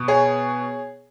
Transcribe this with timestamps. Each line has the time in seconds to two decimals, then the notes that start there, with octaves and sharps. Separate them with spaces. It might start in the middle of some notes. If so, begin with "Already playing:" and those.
Already playing: B2 B3
0.08 G#4 C#5